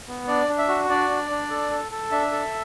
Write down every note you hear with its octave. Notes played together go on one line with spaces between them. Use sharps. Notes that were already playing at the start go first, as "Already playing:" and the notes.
B3
D4 D5
D4
E5
F#4
D4 D5
D4
D4
A4
A4
A4
D4 E5
A4